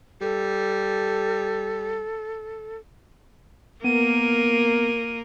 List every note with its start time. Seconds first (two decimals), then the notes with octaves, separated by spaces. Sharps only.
0.21 G3 A4
3.84 A#3 B3 A#4 D#7